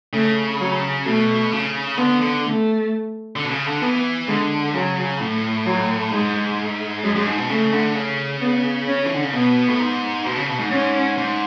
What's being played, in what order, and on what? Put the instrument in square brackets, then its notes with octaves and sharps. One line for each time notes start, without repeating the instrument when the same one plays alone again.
[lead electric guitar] C#3 [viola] A3
[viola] F#3
[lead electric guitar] B2 [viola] A3
[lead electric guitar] C#3
[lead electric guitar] D3 [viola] B3
[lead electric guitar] D3
[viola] A3
[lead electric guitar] D3
B2
C#3
D3
[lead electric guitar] E3 [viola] B3
[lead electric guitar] D3 [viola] G#3
[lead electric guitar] C#3 [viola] F#3
[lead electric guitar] A2
[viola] F#3
[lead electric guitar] G#2 [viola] G#3
[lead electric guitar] F#2 [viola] G#3
[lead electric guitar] F#2
G#2
B2
[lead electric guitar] C#3 [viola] A3
[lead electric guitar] D3
C#3
[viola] B3
C#4
[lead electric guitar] E3
D3
C#3
[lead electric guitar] B2 [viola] B3
[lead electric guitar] A2
G#2
B2
C#3
B2
G#2
[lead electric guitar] G#2 [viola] C#4
[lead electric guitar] G#2